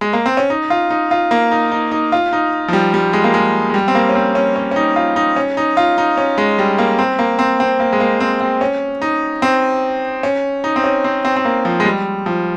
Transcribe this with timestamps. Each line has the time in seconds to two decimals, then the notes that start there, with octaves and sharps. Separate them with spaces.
0.01 G#3
0.13 A#3
0.26 C4
0.37 C#4
0.50 D#4
0.70 F4
0.90 D#4
1.11 F4
1.31 A#3
1.52 D#4
1.72 D#4
1.92 D#4
2.12 F4
2.33 D#4
2.68 F3
2.73 G3
2.94 G3
3.13 G#3
3.24 A#3
3.34 G#3
3.70 G#3
3.74 G3
3.88 C4
3.95 A#3
4.09 C#4
4.15 C4
4.35 C#4
4.56 C#4
4.71 C#4
4.76 D#4
4.96 F4
5.16 D#4
5.36 C#4
5.57 D#4
5.77 F4
5.98 D#4
6.18 C#4
6.38 G#3
6.59 G3
6.78 A#3
6.99 C4
7.19 A#3
7.39 C4
7.60 C4
7.80 A#3
7.93 G#3
8.00 A#3
8.20 C4
8.41 C4
8.61 C#4
9.02 D#4
9.42 C4
10.23 C#4
10.64 D#4
10.76 C4
10.84 C#4
11.04 C4
11.25 C4
11.36 C4
11.45 A#3
11.65 F3
11.80 G#3
11.85 G3
12.26 F3